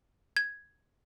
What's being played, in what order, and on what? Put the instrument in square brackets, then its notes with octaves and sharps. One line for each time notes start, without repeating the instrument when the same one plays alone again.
[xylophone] G#6